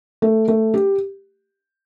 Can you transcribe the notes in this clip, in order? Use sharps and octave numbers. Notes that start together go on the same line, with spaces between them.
A3
A3
G4